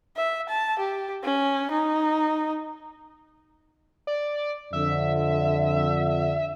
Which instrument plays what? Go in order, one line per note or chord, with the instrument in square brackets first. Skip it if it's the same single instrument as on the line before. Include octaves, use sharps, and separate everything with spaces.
[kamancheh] E5
A5
G4
C#4
D#4
[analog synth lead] D5
[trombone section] F2 D3 [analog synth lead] E5